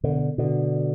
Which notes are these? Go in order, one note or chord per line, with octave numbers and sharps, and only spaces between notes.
B2 D3
B2 D3